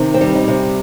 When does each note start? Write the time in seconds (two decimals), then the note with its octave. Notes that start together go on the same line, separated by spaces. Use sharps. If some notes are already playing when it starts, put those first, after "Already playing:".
Already playing: C3 D#3
0.14 C4
0.21 G3
0.35 D#4
0.48 C3